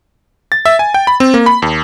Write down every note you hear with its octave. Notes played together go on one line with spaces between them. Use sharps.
A6
E5
G#5
G5
B5
C4
A#3
B5
D#2